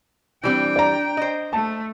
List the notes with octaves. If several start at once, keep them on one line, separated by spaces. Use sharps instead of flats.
E3 G3 C4 D4 G5
D5 A#5
C5 D#5
A3 A5